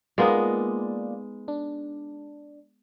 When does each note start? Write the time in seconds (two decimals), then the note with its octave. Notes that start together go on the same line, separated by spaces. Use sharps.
0.18 G#3 A#3 B3 D#4 F4 D5
1.48 D4